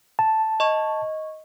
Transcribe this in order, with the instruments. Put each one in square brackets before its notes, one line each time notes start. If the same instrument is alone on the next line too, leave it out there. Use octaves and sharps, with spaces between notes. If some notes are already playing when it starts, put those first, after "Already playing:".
[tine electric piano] A5
[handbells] D#5 C#6